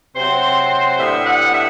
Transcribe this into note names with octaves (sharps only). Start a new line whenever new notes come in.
C3 F#3 C4 C5
A2 G3 B3 D4 E5
F#5
E5